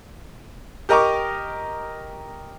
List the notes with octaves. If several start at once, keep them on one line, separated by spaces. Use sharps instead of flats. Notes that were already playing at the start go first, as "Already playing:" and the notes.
G4 A#4 D#5 A#5 C#6 D6